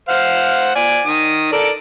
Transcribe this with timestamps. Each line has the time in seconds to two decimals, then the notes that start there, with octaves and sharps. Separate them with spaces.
0.09 C5 F5 F#5
0.76 D5 G#5
1.06 D#3 D#6
1.52 A4 A#4 D5